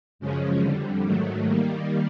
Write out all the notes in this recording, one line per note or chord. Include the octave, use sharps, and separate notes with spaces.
F#2 C#3 F3 G#3 C#4
F2 D3 G3
G#2 D#3 F#3 A3
D#3 G3 A#3